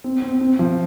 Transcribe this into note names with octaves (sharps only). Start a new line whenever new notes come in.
C4
C4
C4
F3